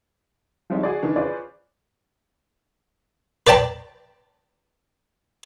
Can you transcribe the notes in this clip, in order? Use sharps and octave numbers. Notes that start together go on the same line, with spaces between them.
F3 G3 G#3 C4 C#4 D#4
F#4 G#4 D5
D#3 E3 D4
C#4 F4 G#4 B4 C5 D5
B4 D5 G5 A5 B5